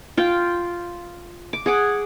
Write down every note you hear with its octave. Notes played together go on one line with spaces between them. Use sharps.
F4 G5
D6
G#4 F#5 D6